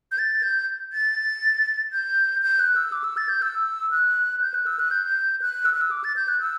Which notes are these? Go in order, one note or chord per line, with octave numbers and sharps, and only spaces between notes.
G6
A6
G6
A6
G6
G6
F#6
E6
D6
E6
A6
G6
E6
F#6
G6
F#6
E6
F#6
G6
F#6
E6
F#6
E6
D6
A6
G6
F#6
E6